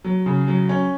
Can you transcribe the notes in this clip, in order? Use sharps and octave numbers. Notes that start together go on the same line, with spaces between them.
F#3
C#3
F#3
C#4